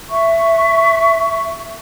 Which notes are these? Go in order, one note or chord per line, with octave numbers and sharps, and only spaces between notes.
E5 C#6